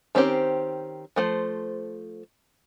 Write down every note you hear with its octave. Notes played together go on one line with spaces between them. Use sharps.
D#3 C4 C#4 G4 C5
F3 A3 C5